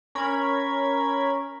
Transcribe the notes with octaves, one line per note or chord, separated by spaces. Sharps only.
C#4 A#4 B5 G#6